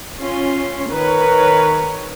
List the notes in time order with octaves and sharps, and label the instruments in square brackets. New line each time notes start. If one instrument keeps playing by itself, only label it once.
[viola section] C#4 F4 C6
[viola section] D#3 B4 C#5 [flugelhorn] A#4